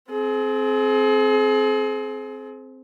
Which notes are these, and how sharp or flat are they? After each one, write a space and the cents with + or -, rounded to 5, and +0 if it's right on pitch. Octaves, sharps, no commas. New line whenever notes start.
C4 +0 G#4 +40